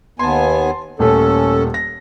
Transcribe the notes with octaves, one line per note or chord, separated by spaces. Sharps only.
D#2 B3 G#5 A5 C6
D#1 A3 C#4 A4
A#6